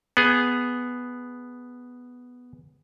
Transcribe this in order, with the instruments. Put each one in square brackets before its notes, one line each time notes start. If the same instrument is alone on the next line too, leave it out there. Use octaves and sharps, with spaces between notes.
[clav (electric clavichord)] B3 G#4